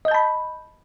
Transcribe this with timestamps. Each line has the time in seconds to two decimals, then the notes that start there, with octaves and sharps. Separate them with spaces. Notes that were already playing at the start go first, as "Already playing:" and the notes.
0.05 D#5
0.08 G6
0.11 A5
0.14 B5